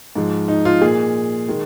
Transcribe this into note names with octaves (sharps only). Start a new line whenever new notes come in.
G#2 F3 G#3
D#4
F4
A#2 G#3 G#4
D#3 G#3